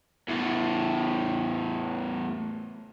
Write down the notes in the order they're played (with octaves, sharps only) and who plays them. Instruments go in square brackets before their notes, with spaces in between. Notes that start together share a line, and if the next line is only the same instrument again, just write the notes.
[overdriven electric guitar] E2 A2